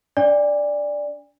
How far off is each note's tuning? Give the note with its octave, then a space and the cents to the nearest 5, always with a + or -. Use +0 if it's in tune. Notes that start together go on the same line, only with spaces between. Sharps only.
D4 -30 D5 +0 G#5 -40